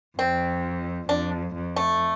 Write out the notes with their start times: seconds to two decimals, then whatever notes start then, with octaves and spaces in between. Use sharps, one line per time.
0.18 F2 C4
1.09 F2 D4
1.55 F2
1.76 A3